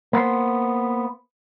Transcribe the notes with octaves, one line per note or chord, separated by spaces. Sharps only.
A#3 B3 C5